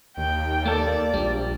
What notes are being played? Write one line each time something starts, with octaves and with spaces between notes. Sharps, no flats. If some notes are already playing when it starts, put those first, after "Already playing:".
D#2 G5
A#3 A4 D5
A#1 G3